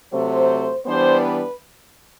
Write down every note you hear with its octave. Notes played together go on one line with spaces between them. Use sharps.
C3 F#3 A3 C5
E3 G3 B3 D4 C5
B4